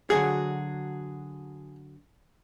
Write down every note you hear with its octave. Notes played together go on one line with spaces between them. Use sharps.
D3 F#3 F#4 G#4